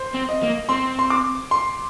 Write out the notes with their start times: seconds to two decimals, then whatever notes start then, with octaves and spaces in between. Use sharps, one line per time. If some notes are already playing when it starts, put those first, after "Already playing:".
Already playing: C5
0.14 C4
0.29 D#5
0.43 A#3
0.69 C4 C6
0.99 C6
1.10 D6
1.51 C6